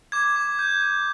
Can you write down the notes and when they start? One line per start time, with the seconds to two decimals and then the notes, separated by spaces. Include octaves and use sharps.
0.12 D6 G#6
0.36 D6
0.59 G6
0.82 G6